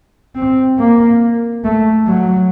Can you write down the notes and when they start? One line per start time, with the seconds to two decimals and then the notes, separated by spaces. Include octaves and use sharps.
0.35 C4
0.79 A#3
1.64 A3
2.07 F#3